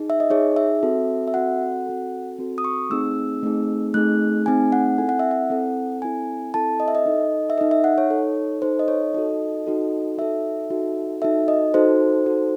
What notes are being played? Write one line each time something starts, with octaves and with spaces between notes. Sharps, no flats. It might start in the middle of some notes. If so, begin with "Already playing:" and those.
Already playing: D#4 G#4
E5
D#5
D#4 G#4 C#5
E5
C4 F#4 A4
E5
C4 F#4 A4 F#5
C4 F#4 A4
C4 F#4 A4
D#6
C#6
A3 C4 D#4 G#4 E6
A3 C4 D#4 G#4
A3 C4 D#4 G#4 F#6
A3 C4 D#4 G#4 G#5
F#5
C4 E4 A4 G#5
F#5
E5
F#5
C4 E4 A4
C4 E4 A4 G#5
C4 E4 A4 A5
D#5
E5
D#5
D#4 A4
E5
D#4 A4 D#5
E5
F#5
C#5
D#4 A4
D#4 A4 C5
D#5
C#5
D#4 F#4 A4 D#5
D#4 F#4 A4
D#4 F#4 A4 E5
D#4 F#4 A4
D#4 F#4 A4 E5
D#5
D#4 F#4 A4 C5
D#4 F#4 A4